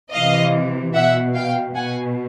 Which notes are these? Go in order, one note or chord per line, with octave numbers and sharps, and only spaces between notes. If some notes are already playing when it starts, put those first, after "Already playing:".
C3 E3 D#5 F5
B2 E5 F#5
F5 G5
B2 F#5 G#5